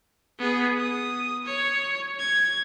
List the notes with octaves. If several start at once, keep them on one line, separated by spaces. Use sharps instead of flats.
B3 G#4
D#6
C#5
G#6